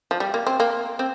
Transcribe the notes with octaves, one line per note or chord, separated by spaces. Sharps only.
F3
G3
A#3
C4
A#3
C4